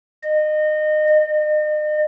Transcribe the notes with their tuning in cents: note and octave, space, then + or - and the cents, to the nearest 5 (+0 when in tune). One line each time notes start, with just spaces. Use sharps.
D#5 -25
D#5 -40